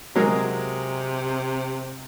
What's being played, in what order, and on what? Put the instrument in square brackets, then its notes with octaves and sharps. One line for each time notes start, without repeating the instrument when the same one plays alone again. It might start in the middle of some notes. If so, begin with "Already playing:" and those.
[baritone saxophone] C3 [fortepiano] F#3 G#3 A#4